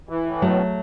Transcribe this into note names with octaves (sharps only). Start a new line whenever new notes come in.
E3
A2
B2 F#3 A3